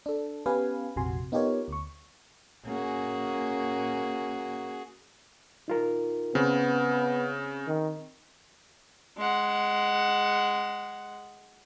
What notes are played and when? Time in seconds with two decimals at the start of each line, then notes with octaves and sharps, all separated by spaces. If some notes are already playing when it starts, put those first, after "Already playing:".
0.06 D4 A4
0.46 B3 C#4 G4 B4 F5 G#5
0.96 A#1 F2 C3 F#4 G#5 C6
1.32 B3 D#4 F4 G4 A#4 C#5
1.68 D2 C#6
2.65 A#3 C#4 F#4 G#4
5.68 D#4 F4 A#4
6.35 C#3 B3 C4
7.67 D#3
9.18 G#3 F#5